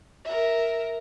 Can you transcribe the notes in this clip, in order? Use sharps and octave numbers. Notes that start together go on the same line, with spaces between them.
A#4 E5